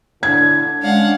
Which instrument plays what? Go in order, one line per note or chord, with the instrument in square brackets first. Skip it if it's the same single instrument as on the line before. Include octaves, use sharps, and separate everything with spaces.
[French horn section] A2 D3 [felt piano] G#6
[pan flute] G#3 [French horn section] C#4 D4 [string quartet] F5 F#5